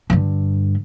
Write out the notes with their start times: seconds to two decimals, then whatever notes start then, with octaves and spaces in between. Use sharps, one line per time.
0.10 G2 D3